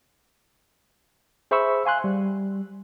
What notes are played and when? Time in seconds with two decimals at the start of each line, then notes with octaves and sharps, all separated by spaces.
1.51 G#4 C5 E5 B5 C#6 E6
1.85 F5 G#5 C6 F#6
2.04 G3